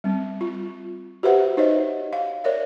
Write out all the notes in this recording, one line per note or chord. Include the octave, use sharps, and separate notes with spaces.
G3 C4
F4
F#4 G4 B4 C5 E5 F#5
D#4 C5 C#5 D#5 E5
F5
A#4 C#5 D5 E5